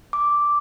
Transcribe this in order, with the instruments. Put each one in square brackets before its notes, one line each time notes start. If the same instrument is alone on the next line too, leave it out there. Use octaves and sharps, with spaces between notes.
[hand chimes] D6